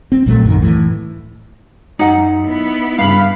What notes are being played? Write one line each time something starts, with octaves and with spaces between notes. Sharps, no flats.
C4
A#1 A#2 F#3 A3
C2 F#2 D#3
A2 E3
F#2 D#4 F#5
B3 E4
G2 C#3 F5 B5